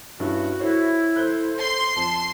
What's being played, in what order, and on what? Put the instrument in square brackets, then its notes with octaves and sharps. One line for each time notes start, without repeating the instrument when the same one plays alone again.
[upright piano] G2 C#4 E4 [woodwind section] F#4
[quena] E4 [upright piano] A4 C5 C#5
[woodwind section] A4 C5 [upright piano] F#6 G6
[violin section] C6
[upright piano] F2 [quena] A5